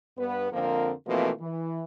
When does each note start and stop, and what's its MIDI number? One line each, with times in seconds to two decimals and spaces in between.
0.18 0.49 43
0.18 0.49 59
0.18 0.49 71
0.52 0.91 41
0.52 0.91 50
0.52 0.91 53
0.52 0.91 58
0.52 0.91 60
0.52 0.91 70
1.07 1.31 47
1.07 1.31 52
1.07 1.31 53
1.07 1.31 57
1.07 1.31 58
1.07 1.31 60
1.40 1.83 52